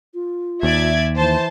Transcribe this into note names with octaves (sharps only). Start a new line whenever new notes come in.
F4
D#2 D5 E5 G#6
E3 C5 A5